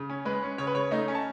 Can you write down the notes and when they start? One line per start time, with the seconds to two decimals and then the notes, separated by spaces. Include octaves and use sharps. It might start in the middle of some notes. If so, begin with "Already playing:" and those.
Already playing: C#3
0.10 C#4
0.25 G#3 B4
0.43 C#4
0.58 C#3 C#5
0.67 B4
0.75 C#3 C#5
0.91 A3 D#4 D#5
1.08 C#4
1.15 A5